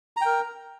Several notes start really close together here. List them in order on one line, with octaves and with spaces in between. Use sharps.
A#5 G5 A#4